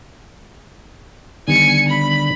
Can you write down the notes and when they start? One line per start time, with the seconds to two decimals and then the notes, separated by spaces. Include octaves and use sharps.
1.48 D3 D#3 G3 B3 G#5 C#7
1.88 B5